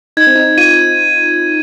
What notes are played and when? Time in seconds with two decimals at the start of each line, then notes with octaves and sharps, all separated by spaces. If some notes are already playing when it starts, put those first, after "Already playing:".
0.17 D#4 G#6
0.27 C4
0.35 D#4
0.57 F4 D#7